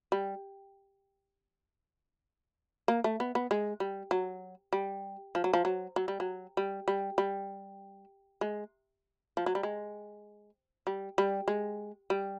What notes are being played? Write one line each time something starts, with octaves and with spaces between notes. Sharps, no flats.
G3
A#3
A3
B3
B3
G#3
G3
F#3
G3
F3
F#3
F3
F#3
F#3
G3
F#3
G3
G3
G3
G#3
F3
F#3
G3
G#3
G3
G3
G#3
G3